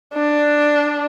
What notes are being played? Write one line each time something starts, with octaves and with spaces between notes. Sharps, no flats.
D4